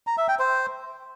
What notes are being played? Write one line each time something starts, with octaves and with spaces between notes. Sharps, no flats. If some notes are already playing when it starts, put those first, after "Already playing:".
A#5
E5
G5
C5